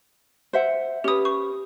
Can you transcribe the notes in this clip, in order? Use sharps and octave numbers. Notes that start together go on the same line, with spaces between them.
C5 E5 F#5
C#4 G4 B4 D#6
C#6